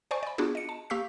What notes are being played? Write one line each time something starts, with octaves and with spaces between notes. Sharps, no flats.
C5 D5 G#5 C#6
D5 B5
B3 D4 F4 F#4 G#4
D#5 C#7
A5
A#3 G4 F5 C#6 E6 B6